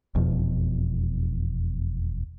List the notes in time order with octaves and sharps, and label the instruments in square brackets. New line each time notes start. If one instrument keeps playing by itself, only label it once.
[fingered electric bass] F1 E2 B2 F3